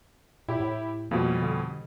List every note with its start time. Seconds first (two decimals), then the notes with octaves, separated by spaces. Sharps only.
0.48 A#2 E4 G4
0.60 A2
1.11 F2 B2 G3 A#3
1.42 D3